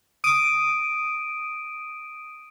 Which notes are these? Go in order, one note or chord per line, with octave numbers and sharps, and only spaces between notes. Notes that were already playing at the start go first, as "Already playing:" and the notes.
D#6 D7 D#7